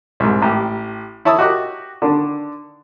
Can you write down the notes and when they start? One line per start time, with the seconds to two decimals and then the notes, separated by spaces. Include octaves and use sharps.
0.20 C2 G#2
0.42 A1 G4
1.25 E4 C#5 A5 D#6 E6
1.39 F#4 G4 D#5 D6 F#6
2.02 D3 D#3 D4